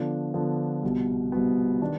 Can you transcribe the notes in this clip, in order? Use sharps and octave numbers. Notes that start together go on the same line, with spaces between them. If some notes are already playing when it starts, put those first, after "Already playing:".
Already playing: D3 F3 B3 D4
D3 F3 B3 D4
C2 B2 B3
C2 B2 B3
D#3 B3 D4